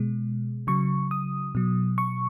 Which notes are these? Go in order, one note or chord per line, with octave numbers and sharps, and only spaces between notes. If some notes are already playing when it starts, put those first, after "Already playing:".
Already playing: B2 G#3
C#3 F#3 C#6
D#6
B2 F#3
C#6